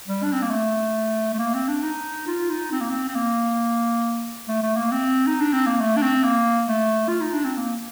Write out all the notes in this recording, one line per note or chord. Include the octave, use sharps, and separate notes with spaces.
G3
D4
C4
A#3
A3
A3
A#3
C4
D4
D#4
F4
D#4
C4
A#3
C4
C4
A#3
A3
A3
A#3
C4
D#4
D4
C4
A#3
A3
D4
C4
A#3
A3
F4
D#4
D4
C4
A#3